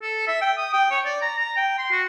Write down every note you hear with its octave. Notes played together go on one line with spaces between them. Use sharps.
A4
E5
G5
D#6
G5
C#5
D5
A#5
A#5
G5
C6
F#4